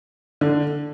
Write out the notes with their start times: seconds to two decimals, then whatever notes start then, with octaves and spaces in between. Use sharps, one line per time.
0.41 D3